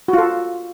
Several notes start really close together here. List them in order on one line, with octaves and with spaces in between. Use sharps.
F#4 F4 A4